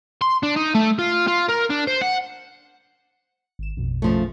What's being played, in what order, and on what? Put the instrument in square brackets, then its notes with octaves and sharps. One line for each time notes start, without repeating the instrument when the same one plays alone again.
[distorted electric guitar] C6
D4
D#4
A3
F4
F4
A#4
D4
C5
F#5
[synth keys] G#1 E7
A#1 F2 B2
[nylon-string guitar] C#3 F3 A3